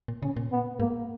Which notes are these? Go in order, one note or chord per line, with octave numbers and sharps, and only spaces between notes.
A#2
C#3 C#4
A#2
B3
G#2 A#3